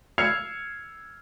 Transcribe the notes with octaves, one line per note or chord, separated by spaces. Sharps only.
E6 F6 G#6 C7 C#7 F7